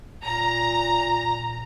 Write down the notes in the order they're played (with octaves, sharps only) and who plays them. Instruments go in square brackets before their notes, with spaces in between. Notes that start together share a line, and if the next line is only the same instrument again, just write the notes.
[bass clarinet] A#2 [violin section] A#5